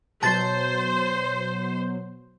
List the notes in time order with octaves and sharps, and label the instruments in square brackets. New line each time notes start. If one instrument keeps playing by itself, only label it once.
[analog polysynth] B2 F#3 [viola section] C5 [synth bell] A5 A6